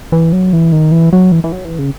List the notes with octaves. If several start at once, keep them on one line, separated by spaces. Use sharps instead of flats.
E3
F#3
E3
D#3
E3
F#3
E3
E3
F#3
E3
C#3